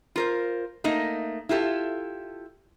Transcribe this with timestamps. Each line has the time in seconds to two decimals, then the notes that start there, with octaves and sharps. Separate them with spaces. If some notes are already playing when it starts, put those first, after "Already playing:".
0.16 F4 A#4 C5
0.84 A3 A#3 D#4 D#5
1.49 E4 F4 G4 A4